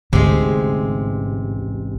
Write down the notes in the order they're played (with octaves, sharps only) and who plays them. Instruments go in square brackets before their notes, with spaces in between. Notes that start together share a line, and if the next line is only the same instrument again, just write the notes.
[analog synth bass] A1 [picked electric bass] D2 [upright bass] G#2 [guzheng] C3 G#3